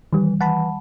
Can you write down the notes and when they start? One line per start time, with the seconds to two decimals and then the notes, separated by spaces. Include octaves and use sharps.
0.13 D#3 E3 G3
0.41 E3 F#5 A5 B5